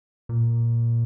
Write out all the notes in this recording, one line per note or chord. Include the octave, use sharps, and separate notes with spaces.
A#2